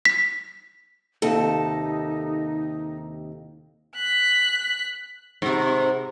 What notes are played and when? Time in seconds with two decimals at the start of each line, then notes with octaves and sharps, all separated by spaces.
0.05 B6
1.22 D#2 C3 D#4 A4
3.96 F#6 B6
5.42 G#2 C3